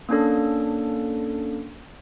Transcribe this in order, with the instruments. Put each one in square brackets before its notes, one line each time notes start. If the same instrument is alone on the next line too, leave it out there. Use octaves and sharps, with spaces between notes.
[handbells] A#3 C#4 D4 A4